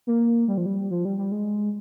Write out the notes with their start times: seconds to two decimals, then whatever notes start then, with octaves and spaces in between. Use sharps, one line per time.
0.07 A#3
0.48 G3
0.58 F3
0.66 G3
0.91 F3
1.05 G3
1.18 G3
1.32 G#3